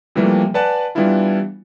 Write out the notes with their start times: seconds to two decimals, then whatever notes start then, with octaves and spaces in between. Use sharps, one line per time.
0.15 C3 E3 F3 G3 A3 A#3
0.54 B4 D5 F#5 G#5 A5
0.95 E3 G3 B3 D4 E4 F4